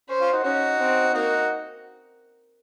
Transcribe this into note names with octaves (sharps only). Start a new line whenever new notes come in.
C#4 C5
C#4 F4
D#4 F#4
C#4 D#4 F#4
C4
A#3 D#4 F#4